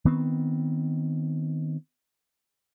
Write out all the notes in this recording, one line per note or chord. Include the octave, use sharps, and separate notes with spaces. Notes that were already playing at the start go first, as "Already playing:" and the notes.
D#3 B3 C4